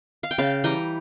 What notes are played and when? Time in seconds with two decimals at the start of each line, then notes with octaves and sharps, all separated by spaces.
0.23 F5
0.31 G5
0.38 C#3 F5 A5
0.64 E3 G3 G5 A#5